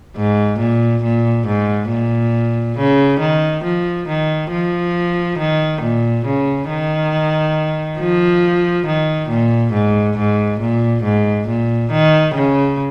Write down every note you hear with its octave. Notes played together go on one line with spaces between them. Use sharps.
G#2
A#2
A#2
G#2
A#2
C#3
D#3
F3
D#3
F3
D#3
A#2
C#3
D#3
F3
D#3
A#2
G#2
G#2
A#2
G#2
A#2
D#3
C#3